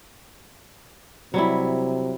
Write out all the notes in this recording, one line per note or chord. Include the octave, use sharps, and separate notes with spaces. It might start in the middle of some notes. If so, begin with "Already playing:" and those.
C3 F#3 G3 E4